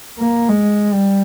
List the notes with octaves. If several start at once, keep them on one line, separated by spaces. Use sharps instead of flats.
A#3
G#3
G3